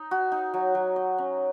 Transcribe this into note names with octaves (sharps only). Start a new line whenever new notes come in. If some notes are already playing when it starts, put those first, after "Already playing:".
Already playing: D#4
F#4
D#4
F#3
F#3
D#5
C#4